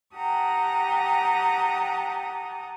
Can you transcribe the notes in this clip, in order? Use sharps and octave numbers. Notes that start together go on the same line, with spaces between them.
G4 F#5 G5 A5 A#5 D#6